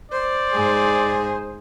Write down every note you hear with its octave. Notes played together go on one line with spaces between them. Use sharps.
C5 D5
G#2 G#4